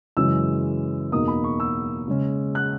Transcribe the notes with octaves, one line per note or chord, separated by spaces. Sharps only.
F#2 C#3 E3 G#3 C#4 E6
E2 B2 A#3 D#4 D#6
B5
C#6
E6
C#3 G#3 C#4
F#6